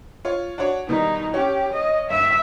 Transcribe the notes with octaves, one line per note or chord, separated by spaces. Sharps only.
F4 C#5
D4 F#4 C#5
B2 D#3 G3 D#4
C#4 G4
D#5
G2 E5